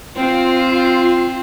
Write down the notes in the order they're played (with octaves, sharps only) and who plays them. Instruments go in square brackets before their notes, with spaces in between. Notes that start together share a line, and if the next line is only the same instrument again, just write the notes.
[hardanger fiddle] C4 [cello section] F4